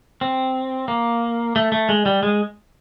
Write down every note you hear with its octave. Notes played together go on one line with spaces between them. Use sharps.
C4
A#3
A3
A3
G#3
G3
G#3